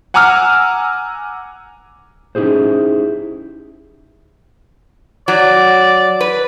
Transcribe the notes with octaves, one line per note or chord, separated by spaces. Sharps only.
F#5 G#5 A#5 D6 E6 F6
C#4 D#4 E4 G4 G#4 C5
F#3 D5
B4